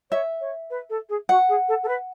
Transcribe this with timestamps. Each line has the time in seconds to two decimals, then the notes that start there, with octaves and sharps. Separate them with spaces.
0.11 C#5 E5
0.41 C#5
0.70 B4
0.90 A4
1.09 G#4
1.29 F#4 F#5
1.49 G#4
1.68 A4
1.83 A4
1.88 B4